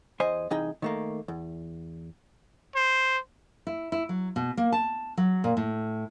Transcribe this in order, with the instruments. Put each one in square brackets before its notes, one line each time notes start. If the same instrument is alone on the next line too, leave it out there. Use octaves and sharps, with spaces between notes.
[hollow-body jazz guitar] E2 C5 D#5 G#5
C2 E3 D#4 G#4 G5
D#3 A3 A#3
E2
[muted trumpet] C5
[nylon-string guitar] E4
E4
F#3
B2
A#3
A5
F#3
A#2
A2